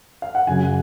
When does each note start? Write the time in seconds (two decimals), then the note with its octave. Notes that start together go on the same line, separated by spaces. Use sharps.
0.22 F5
0.35 F#5
0.47 F#2 C#3 F#3 G#5